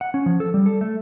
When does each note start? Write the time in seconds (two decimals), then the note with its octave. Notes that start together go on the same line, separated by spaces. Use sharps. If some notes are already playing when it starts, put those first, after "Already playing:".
0.01 F#5
0.14 C#4
0.26 F3
0.40 A4
0.54 G3
0.66 A4
0.81 A3